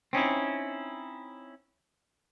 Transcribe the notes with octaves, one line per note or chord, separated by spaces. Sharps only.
C4 C#4 D#4 E4